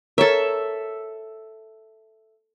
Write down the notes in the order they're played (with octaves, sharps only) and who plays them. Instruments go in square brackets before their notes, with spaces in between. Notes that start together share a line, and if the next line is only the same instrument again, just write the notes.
[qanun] A4 E5 [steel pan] A#4 C#5